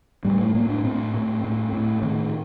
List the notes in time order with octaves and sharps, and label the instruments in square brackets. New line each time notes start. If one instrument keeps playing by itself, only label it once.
[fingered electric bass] A2 G3
A3
A2 A#3
D4
A2 C4
A2
A2
A2
A2 D#3